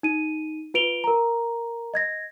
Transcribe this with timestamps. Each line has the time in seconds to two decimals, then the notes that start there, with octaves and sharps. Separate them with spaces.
0.03 D#4 D#7
0.74 F4 B4 D7 F7 G7
1.04 A#4 A#5
1.94 D#5 G#6 A#6